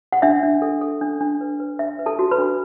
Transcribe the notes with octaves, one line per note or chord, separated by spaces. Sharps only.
F#5
D4 E5
D4
A4
A4
D4
D4
B4
B4
D4 E5
B4
A4 A5
F#4
B4 B5
D4